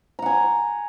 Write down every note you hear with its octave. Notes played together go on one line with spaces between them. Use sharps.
F#5 G#5 A#5